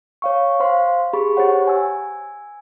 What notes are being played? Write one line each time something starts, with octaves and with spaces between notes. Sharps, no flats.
C#5 F5 C#6
C5 F5 C6
G4 G#4 B5 C#6
G4 C5 C#5 F#5
G#5 E6